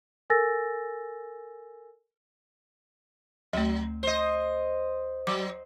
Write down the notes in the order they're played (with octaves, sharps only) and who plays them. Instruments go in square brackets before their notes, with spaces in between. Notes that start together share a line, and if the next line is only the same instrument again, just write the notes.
[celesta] A4 A#4 G#5 E6 A6 A#6
[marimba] D2 A3 [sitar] F#3
[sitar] C5 D#5
[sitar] F#3 [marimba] D6